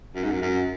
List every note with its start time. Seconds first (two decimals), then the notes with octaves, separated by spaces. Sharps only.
0.15 F#2
0.23 G#2
0.31 F#2
0.42 F#2